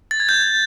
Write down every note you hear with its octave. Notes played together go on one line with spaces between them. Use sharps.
A6
G#6
G6